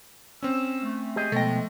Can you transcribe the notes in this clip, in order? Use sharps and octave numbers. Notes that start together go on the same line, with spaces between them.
C4 C#4 E6
A3
G4 G#4 D#5
B2 F3 G#3 A3 G5 A#6